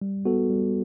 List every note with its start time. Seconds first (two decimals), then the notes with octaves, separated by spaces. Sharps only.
0.02 G3
0.25 B3 F#4 A4
0.50 G3